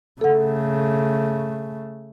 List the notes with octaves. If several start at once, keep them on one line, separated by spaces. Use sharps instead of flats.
C#3 A3 A4 F#5